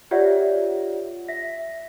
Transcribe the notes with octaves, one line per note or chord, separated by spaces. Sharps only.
F4 G4 C#5 D5 E5 F#5
E5 A#6 B6